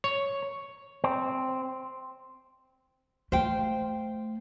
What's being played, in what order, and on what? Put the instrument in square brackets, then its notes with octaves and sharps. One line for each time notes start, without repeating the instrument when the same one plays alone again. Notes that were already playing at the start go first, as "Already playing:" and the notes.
[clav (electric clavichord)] C#5
[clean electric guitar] C4
[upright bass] A3 [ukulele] C5 F5 G5